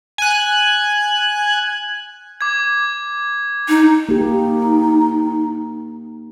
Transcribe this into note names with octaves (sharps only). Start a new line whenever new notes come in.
G#5 F#6
D6 G#6
D#4
A#3 D#4 G4